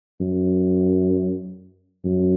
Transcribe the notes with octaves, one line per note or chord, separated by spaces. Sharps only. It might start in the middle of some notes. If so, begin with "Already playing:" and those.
F#2
F#2